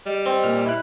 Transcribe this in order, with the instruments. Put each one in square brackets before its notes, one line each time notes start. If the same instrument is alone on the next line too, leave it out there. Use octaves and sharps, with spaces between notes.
[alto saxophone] G3 [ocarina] D#5
[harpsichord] C4
[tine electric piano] A#2 F6
E4 F#6